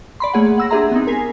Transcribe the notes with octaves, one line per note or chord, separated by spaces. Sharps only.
D5 B5 C6
A3 A#3 G#4 C#5 F#5
F#5 E6 A#6
D4 G4 G#4 E5 A#5 C6
B3 C4 D#4
A#4 G#5 B6 C7